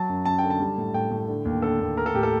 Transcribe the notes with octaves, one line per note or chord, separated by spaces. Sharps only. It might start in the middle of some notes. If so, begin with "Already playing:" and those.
Already playing: F#3 A5
F#2
F#2 A5
D3 G5
A5
G3
A2
A2 G5
A2
D3
D#2
D3 A4
D#2
A3 A#4
A4
A2 G4
A4